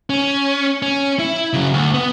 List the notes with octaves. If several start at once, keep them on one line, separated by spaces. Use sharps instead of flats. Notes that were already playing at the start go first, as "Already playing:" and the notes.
C#4
C#4
E4
C#3 F#3
D2
B3